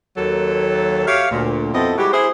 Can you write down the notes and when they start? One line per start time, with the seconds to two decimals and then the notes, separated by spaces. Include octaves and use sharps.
0.17 D#2 F#3 A4
1.07 G4 C#5 E5 F5
1.31 D2 A#2
1.74 F2 B2 C4 E4 A4 D#5
1.98 G3 G#3 E4 F#4 G4
2.13 E4 G#4 C5